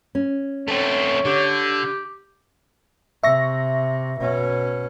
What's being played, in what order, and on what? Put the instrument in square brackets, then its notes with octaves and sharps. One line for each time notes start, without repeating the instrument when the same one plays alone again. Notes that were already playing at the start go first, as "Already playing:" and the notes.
[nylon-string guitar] C#4
[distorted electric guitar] A3 C4 [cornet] C#5
[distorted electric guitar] D3 [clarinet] G4
[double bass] C3 [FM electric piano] E5 C#6 A#6
[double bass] B2 C#4